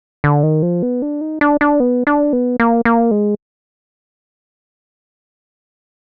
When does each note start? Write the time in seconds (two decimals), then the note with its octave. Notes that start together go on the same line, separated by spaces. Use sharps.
0.24 D3
0.43 D#3
0.63 F3
0.83 B3
1.02 D4
1.21 D#4
1.41 D4
1.61 D4
1.80 B3
2.07 D4
2.33 B3
2.60 A#3
2.85 A#3
3.11 G#3